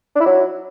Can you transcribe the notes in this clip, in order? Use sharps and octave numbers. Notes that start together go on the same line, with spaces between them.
D4
E4
F#3